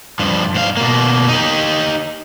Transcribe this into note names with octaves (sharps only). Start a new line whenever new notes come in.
G2 F3
G#2 F5
B2 A#3
D#4 G4